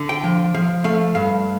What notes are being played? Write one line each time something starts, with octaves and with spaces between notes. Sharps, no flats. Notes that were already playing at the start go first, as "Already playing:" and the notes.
Already playing: D3
G5
F3
F3 F5
A3 F5
G2 F5